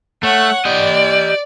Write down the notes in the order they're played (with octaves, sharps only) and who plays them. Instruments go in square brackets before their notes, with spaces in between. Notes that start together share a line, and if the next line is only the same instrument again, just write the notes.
[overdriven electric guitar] A3 [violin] C#5 F#5
[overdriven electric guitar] G4 D#5 [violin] D5